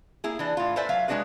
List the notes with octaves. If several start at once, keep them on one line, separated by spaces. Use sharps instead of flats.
A#3 E4 G#4
E3 D4
A2 F4
A4 B4 C5 D5 E5 G#5
F#3 E5 F5
G#3 C#4 D4 F#4 G#4 B4